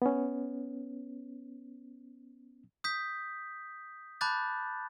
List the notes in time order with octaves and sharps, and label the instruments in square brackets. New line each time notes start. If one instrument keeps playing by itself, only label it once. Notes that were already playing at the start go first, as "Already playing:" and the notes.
[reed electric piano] B3 C#4
[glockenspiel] D#6 G6 B6
A5 B5 D6 F#6 G6 A6